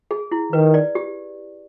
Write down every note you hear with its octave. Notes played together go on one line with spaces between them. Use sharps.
G#4
E4
D#3 B4
D5
G4